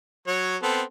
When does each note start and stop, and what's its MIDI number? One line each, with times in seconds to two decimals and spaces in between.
0.27 0.57 54
0.27 0.57 73
0.63 0.82 59
0.63 0.82 60
0.63 0.82 69